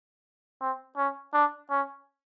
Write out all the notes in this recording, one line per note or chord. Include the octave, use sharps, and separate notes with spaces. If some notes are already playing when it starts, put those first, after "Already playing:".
C4
C#4
D4
C#4